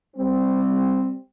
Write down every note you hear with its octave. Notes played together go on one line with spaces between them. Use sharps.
G3 C4